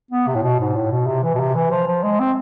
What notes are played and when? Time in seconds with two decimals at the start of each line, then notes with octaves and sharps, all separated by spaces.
0.11 B3
0.27 C3
0.35 A2
0.43 B2
0.59 G#2
0.76 A2
0.91 B2
1.07 C3
1.24 E3
1.35 B2
1.40 C3
1.55 E3
1.71 F3
1.87 F3
2.03 G#3
2.20 C4